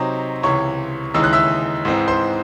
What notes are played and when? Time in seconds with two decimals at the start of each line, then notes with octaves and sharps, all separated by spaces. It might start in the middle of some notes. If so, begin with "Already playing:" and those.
Already playing: C3 F#3 C4 D#4 C#5
0.43 C#2 C3 E3 C#5 C#6
1.14 D#2 C#3 E3 G#3 D#4 E6
1.24 F#6
1.33 E5 E6
1.85 G#2 E3 C4 D#4
2.08 C5 C6